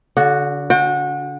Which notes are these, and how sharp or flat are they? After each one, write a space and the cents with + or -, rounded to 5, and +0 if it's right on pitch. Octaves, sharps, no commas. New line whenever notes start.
D3 -35 D4 +15 F#4 +0
F#4 -25 G5 +20